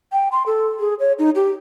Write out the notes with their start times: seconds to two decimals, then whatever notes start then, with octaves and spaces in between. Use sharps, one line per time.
0.12 G5
0.32 C6
0.46 A4
0.80 G#4
1.00 C#5
1.19 D#4
1.35 G4